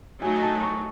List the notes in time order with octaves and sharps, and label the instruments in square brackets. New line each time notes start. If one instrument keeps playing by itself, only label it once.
[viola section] F#3 A3 D#4 [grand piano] G#5
[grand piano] A5
C#6